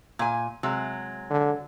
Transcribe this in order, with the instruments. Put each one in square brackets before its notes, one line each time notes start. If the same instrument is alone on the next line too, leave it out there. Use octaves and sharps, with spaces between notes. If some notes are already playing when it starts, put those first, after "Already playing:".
[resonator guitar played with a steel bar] A#2 G#5
C3 F#3 G#3
[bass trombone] D3